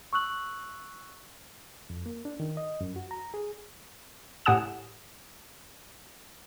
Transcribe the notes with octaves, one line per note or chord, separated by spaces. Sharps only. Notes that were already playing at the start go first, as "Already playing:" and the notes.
C#6 E6 F#6 F#7
F2
A#3
D4
D#3
D#5
F#2
F#4
A#5
G#4
A2 G4 F#5 G#5 D#6 E7